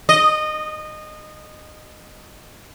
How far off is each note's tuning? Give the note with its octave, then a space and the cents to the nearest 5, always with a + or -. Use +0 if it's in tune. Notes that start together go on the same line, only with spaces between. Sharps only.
D#5 -20